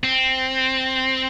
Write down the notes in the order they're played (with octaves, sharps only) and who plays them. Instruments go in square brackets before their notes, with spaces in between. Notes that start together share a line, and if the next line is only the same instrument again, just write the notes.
[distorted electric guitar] C4